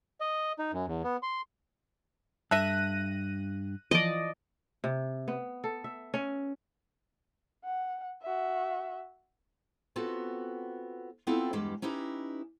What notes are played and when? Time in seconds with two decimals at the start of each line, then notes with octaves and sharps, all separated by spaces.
0.21 D#5
0.59 D#4
0.73 F#2
0.87 E2
1.04 B3
1.23 C6
2.51 G2 A4 E5 F#6 A#6 D#7
3.91 E3 F3 D5 D#5
4.84 C3
5.28 B3
5.64 A4
5.84 E5
6.14 C#4
7.64 F#5
8.22 F#4 E5
9.96 B3 C4 F4 F#4 A4
11.27 B3 C4 E4 F4 A4 G5
11.53 E2 G2 G3 G#3 G4
11.82 C#4 D#4 E4 G4 B4